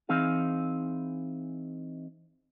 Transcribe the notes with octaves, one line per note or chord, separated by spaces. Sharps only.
E3 C4 D#4 G#4 F5